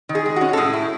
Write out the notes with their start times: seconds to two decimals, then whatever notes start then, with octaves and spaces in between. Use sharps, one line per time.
0.09 D#3
0.15 G#4
0.26 G#3
0.36 C#4 F#4
0.53 A4
0.57 A2 G#4
0.73 E4